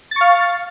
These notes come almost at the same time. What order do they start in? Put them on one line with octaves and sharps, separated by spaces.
A6 C#6 F5